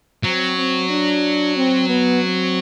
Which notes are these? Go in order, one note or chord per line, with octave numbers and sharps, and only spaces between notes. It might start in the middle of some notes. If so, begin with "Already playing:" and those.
F#3 C4
C4
D4
C4
B3
C4